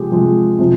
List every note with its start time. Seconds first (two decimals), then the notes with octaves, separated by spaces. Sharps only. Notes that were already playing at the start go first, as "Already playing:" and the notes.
Already playing: C3 F3 G#3 G4
0.11 C3 F3 G#3
0.59 C3 F3